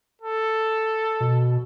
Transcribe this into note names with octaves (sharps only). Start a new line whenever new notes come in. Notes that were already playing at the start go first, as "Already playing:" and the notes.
A4
B2